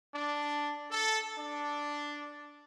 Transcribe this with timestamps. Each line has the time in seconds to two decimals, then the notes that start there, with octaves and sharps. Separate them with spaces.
0.14 D4
0.90 A4
1.38 D4